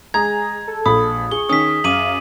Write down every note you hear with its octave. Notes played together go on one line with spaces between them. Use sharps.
G#3 G#4 A#5 G#6
A4
A#1 B5 D#6
G#4 C#6 G7
D#3 C#4 D#6 B6
F#2 F5 D6 D#7 F#7